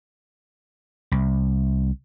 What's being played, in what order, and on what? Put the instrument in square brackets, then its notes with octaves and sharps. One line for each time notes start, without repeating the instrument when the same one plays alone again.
[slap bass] C2